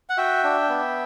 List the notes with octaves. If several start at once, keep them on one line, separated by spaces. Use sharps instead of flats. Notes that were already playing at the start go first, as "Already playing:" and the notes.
F#5
F#4 E5 G5
D4
B3